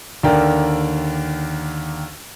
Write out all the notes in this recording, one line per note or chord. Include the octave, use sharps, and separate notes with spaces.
D#2 D3 A#4 D5 G5